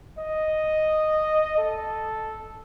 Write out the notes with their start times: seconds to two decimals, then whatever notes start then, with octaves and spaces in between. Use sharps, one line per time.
0.18 D#5
1.58 A4